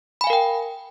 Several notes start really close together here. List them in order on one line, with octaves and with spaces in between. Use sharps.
B5 G#5 F5 A#4 G5